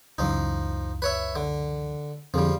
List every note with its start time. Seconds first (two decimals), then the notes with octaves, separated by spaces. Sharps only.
0.18 C#2 F#2 E3 F3 D#4
1.02 B4 C#5 E5
1.36 D3
2.34 F2 D3 F3 G3 G#4